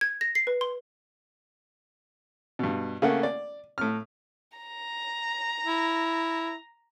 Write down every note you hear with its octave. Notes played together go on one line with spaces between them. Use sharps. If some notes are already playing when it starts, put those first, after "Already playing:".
G#6
A#6
C7
B4
C6
G2 B2
C#3 A3 A#3 F#5
D5
A2 F6
A#5
E4